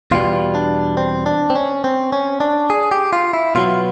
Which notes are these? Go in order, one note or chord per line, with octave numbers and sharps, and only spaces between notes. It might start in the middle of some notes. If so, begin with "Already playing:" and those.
E2 B2 G3 F4
D4
C4
D4
C4
C#4
C4
C#4
D4
G#4
G4
F4
E4
B2 F#3 B3 F4